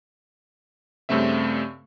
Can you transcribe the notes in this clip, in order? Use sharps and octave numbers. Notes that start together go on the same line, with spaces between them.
G2 C#3 A3 C4 E5